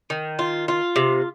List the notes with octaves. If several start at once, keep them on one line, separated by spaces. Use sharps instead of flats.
D#3
F4
F4
C3